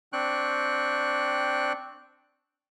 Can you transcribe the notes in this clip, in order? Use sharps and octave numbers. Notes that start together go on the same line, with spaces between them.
C4 D4 G5 C#6 F#6